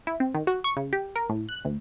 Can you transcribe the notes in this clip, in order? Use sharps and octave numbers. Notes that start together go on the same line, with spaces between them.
E4
C4
D#3
F#4
C#6
C#3
G4
A#4
A2
F#6
D2